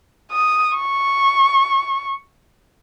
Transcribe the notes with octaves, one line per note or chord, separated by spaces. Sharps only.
D#6
C#6